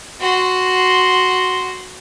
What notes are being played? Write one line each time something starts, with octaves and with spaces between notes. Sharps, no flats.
F#4 C6